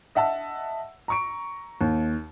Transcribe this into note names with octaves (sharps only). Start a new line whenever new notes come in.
D#5 E5 F#5 A5 E6
A#5 C#6 D7
D#2